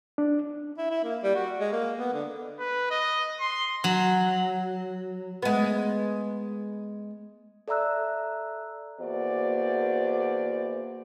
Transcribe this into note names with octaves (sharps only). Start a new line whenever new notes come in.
D4
E4
E4
A#3
G3
F#4
G#3
A#3
B3
D3
B4
D#5
C6
F#3
G#3 B3
A4 D5 E5 A#5 E6 F#6
E2 A#3 F#4 C5 D5